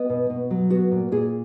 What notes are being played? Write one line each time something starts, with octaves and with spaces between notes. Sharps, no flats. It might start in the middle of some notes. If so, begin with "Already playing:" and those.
Already playing: B3 D#5
B2
B2
F#3
B3 F#4
A#2
A#2 G#4